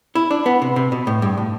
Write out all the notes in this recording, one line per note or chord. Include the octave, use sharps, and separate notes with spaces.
E4
D4
B3
C3
C3
B2
A2
G2
A2